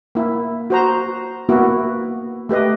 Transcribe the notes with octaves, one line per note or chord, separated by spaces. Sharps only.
A#3 E4
F#4 C5 A#5
A#3 B3 E4 F#4
A3 G4 B4 D#5